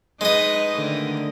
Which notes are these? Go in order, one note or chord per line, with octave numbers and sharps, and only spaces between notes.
G#3 D#4 B4 D#5
D3 D#3 A3